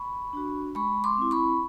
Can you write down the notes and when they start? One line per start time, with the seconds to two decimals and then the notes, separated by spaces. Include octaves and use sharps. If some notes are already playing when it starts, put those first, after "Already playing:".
Already playing: B5 C#6
0.33 D4 F#4
0.75 G#3 B5 C#6
1.04 C6 D6
1.18 C4 E4
1.31 B5 C#6